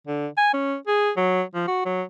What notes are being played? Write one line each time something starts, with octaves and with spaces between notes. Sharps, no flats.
D3
G#5
C#4
G#4
F#3
F3
F#4
F#3